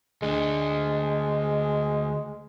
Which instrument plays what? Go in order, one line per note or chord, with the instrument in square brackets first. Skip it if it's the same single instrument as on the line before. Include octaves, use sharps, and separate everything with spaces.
[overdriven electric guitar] D2 D3 [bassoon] G#3